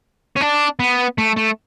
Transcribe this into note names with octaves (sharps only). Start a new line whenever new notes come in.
C#4
D4
B3
A3
A3